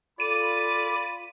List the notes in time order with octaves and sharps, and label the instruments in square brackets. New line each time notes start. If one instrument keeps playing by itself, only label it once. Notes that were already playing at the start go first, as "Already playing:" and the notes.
[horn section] F4 B5 [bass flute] A4 [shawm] D5 [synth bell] D#7